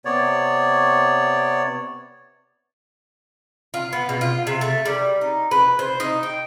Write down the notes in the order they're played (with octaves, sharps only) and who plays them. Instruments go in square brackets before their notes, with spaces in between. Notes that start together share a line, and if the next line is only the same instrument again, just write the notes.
[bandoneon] C3 B3 C#5 D5
[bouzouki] F4
B3
B2
F4
C3
A3
G3
D#4
B4
C5
D#4
G5